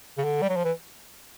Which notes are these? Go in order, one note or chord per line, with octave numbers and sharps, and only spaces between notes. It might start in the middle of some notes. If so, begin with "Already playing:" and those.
C#3
D3
G3
F#3
F3
E3